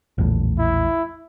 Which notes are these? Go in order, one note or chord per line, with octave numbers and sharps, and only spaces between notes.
A#1 E2 A2
E4